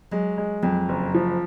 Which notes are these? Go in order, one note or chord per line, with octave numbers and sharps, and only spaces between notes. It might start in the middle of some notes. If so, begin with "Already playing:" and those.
F#3 G#3
G#3
F2 F#3
F#1
F3